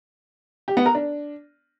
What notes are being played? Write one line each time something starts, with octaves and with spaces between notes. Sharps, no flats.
G4
B3
A#4
D4